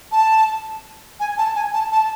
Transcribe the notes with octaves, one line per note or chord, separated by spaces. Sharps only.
A5
G#5
A5
G#5
A5
A5